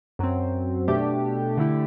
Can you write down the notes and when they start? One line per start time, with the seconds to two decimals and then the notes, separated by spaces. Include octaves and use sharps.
0.19 F#2 F#3 C4
0.88 B2 A3 D4 G4
1.57 D3 A3 E4 G4